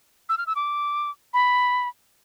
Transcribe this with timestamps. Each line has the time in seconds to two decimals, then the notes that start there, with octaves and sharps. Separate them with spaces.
0.29 E6
0.38 F6
0.47 E6
0.56 D6
1.34 B5